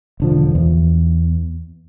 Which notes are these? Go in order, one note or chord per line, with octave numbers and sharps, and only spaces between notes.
E1 D3 F3
E2